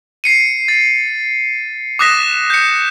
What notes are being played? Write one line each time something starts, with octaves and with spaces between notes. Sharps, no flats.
C7 C#7 D#7
A6
D6 D#6 F#6 A#6 B6 E7
G6 C#7